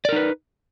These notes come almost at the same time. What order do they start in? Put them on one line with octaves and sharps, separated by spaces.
D5 A#4 D#4 B4